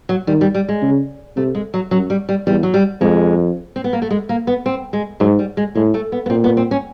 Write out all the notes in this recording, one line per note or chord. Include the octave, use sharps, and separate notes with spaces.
F#3
D#3 G3
G3
G3
G#3
C#3
C3 A3
G#3
F#3
F#2 F#3
G3
G3
E2 G3
F#3
G3
F2 G#3
C4
B3
A#3
A3
G#3
A#3
B3
C4
G#3
G#2 F#3
G3
G#3
A2 G#3
A3
B3
B3
A#2 C4
B3
C4
C#4